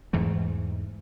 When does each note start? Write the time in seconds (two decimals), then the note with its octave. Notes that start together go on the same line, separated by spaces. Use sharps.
0.13 E2 G#2 E3 A3